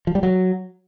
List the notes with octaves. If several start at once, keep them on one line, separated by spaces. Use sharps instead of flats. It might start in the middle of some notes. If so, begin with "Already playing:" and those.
F3
G3
F#3